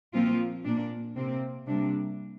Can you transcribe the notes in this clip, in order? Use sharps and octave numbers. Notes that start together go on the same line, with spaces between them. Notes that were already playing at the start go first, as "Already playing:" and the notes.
A#2 F3 A#3 C4 F4
A#2 A#3 D4
C3 A#3 C4
C3 G3 A#3 D4